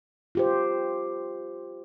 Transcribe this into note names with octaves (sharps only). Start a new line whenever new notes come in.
F4 G4 C5